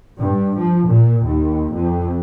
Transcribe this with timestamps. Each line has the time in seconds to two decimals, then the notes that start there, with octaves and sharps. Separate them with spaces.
0.17 G2
0.59 F3
0.88 A#2
1.25 D#2
1.75 F2